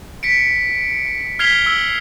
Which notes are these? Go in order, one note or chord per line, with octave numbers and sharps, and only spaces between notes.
B6 C#7 D7
F6 G#6 B6 C7 F7 G7
E6 G#6